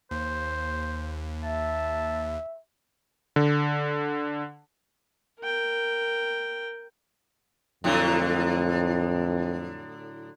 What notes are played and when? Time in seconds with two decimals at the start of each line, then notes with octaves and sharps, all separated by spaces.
0.11 D#2 C5
1.43 E5 A5
3.36 D3
5.40 A#4 G5
7.84 F2 A2 D3 F#3